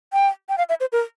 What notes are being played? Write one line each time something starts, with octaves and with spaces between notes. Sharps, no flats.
G5
G5
F5
E5
C5
A#4